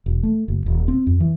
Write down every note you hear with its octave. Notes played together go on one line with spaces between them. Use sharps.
E1
A3
F#1
D#1
C4
F2
E3